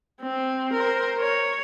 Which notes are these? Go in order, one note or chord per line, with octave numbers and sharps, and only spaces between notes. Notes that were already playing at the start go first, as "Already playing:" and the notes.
C4
A#4 C5
C#5